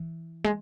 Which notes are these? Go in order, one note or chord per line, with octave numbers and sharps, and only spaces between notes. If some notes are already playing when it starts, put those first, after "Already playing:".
Already playing: E3
G#3